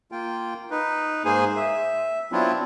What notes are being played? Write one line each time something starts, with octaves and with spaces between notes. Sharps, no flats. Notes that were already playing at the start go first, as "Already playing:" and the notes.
A#3 F4 G5
D#4 B4
G#2 A#3 G#4 C5 G#5
E5
F#3 B3 C4 D4 E4 F4